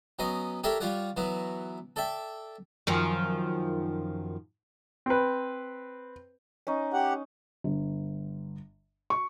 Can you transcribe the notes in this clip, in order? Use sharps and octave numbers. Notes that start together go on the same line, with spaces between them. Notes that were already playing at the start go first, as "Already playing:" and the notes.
F#3 B3 C#4 D#5
G4 A4 A#4 C#5 D5 E5
G3 F4 C#5 D5 F#5
E3 F#3 B3 F#4
A4 D5 E5 G5
F#2 D#3 F3
C4 B4
C#4 D#4
G4 F#5
G1
C#6